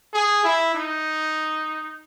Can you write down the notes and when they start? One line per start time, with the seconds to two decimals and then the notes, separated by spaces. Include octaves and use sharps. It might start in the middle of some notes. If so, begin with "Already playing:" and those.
0.13 G#4
0.44 E4
0.75 D#4